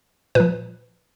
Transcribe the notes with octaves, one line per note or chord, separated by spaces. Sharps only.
A#2 F3 B4